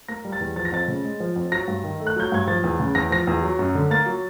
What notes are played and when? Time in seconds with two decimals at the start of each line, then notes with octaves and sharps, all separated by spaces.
0.08 A#3 A#6
0.25 G3
0.32 A6
0.41 E2
0.56 F3 A6
0.65 A#6
0.72 F2 A6
0.88 C#3
1.04 G#3
1.20 F3
1.36 F2
1.52 F#3 A#6
1.68 G2
1.84 D#3
2.00 A3
2.07 F#6
2.16 F#3 G6
2.32 G2 G#6
2.48 F3 A6
2.64 E2
2.80 C#3
2.95 E2 A#6
3.11 F3 A#6
3.27 E2
3.43 F#3
3.59 F#2
3.75 D3
3.90 A#3 A6
4.06 F#3